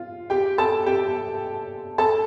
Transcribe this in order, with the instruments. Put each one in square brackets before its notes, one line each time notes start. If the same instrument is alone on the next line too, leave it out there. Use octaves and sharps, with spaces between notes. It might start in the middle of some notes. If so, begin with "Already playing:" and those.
Already playing: [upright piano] F4
G4 G5
A4 A5
G4 G5
A4 A5